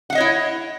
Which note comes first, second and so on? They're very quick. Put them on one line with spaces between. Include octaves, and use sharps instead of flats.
F#5 F5 D#5 C#5 E4